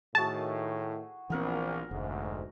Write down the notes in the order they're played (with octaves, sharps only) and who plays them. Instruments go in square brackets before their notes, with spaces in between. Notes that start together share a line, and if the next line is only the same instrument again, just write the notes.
[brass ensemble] A2 D#3 [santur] F#4 G#4 [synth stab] A5
[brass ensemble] A#1 [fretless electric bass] E3 C4 [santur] B3 A#4 F#5
[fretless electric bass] F1 [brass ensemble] D2 G#2